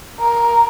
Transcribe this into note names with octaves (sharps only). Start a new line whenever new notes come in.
A#4